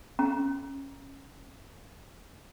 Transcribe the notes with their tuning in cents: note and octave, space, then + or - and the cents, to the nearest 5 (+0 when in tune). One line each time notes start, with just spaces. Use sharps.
C#4 -30 G5 +0 A#5 +15